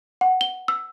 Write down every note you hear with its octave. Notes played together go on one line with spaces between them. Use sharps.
F#5
G7
E6